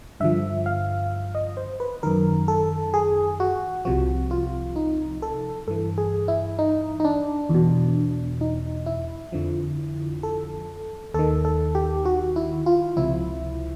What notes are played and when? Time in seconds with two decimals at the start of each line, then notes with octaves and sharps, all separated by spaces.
0.20 G2 D3 F3 E5
0.66 F5
1.35 D#5
1.57 C5
1.80 B4
2.03 F#2 D#3 A#4
2.48 A4
2.94 G#4
3.40 F#4
3.85 C2 C3 F3 F#4
4.31 F4
4.76 D#4
5.22 A4
5.67 G2 E3 A4
5.98 G#4
6.28 E4
6.59 D#4
7.00 D#4
7.05 D4
7.49 E2 B2
8.41 D#4
8.86 E4
9.32 F2 D3 F3
10.23 A4
11.14 D#2 D#3 A4
11.45 A4
11.75 G4
12.05 F#4
12.36 E4
12.66 F4
12.97 C#2 C3 F3 E4